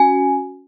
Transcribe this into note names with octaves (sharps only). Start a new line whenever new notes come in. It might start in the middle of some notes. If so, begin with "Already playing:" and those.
Already playing: C#4 F#4 G#5